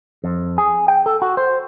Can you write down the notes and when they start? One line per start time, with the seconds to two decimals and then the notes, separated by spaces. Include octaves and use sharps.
0.24 F2
0.58 G#4
0.88 G5
1.06 A4
1.22 F#4
1.37 C5